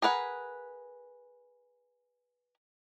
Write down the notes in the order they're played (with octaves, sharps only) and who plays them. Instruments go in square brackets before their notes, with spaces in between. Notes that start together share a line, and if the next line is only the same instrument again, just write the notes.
[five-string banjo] G#4 A#4 B4 F#5